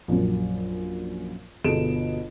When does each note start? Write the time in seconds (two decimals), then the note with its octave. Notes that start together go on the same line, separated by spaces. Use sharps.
0.08 A#1 F#2
1.64 G1 B2 G#4 A4 D7 E7